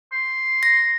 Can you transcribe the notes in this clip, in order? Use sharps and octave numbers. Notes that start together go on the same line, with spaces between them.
C6
A#6